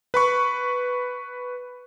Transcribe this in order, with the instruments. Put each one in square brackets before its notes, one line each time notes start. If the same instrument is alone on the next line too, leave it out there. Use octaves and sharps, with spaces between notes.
[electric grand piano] B4 B5 C#6